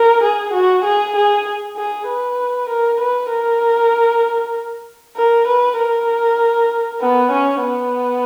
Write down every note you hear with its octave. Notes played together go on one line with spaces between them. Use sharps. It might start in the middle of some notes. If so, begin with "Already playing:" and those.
Already playing: A#4
G#4
F#4
G#4
G#4
G#4
B4
A#4
B4
A#4
A#4
B4
A#4
B3
C#4
B3